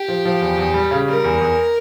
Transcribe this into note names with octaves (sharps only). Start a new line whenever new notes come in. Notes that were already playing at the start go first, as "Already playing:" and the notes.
Already playing: G4
F3
F3
E2
E2
G3
C#3
G3 A#4
E2
E2